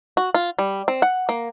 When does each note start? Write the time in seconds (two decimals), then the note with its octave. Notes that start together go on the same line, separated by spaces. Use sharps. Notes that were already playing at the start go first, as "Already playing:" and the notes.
0.17 F#4
0.34 F4
0.59 G3
0.88 C4
1.02 F#5
1.29 A#3